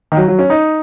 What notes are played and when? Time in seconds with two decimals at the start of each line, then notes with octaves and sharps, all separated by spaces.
0.12 D#3
0.17 F#3
0.28 F#3
0.39 C#4
0.50 D#4